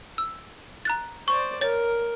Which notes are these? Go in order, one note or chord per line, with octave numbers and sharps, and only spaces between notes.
E6
A#5 F#6 A6
C5 D5 C#6
A#4 C#5 A6